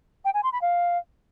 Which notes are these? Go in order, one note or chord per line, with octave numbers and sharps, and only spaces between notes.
G5
G#5
C6
B5
F5